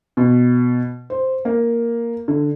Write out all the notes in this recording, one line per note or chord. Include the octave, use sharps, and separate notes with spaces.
B2
C5
A#3
D3